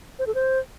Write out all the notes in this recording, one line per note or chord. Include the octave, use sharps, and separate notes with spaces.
C5
A4
C5